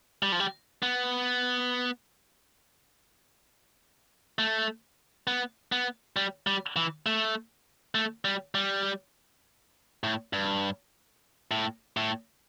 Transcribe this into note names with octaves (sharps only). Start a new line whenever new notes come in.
G3
F3
G3
B3
A3
B3
B3
G3
G3
E3
A3
A3
G3
G3
A2
G2
A2
A2